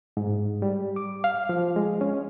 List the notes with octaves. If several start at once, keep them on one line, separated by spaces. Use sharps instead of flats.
G#2
G3
D6
F5
F3
G#3
C#4